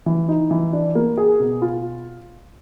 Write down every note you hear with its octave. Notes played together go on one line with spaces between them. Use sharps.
E3
D#4
E3
D4
A#3
G#4
B2
F4